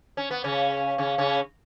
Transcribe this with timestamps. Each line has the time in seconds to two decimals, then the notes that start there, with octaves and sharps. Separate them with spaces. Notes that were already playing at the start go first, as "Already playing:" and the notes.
0.17 C#4
0.31 B3
0.44 C#3 C#4
0.98 C#3 C#4
1.18 C#3 C#4